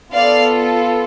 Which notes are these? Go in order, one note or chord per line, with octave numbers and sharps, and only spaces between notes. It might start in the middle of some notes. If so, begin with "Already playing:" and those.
B3 F4 A4 D5 F5